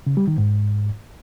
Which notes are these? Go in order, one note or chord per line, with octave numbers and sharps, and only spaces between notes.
C#3
G3
D#3
G#2